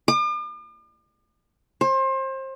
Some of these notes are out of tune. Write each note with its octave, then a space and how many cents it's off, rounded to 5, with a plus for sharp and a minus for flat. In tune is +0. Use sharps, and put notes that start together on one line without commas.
D6 +45
C5 +30